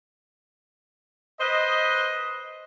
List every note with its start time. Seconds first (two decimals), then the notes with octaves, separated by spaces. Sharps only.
1.41 B4 C5 D#5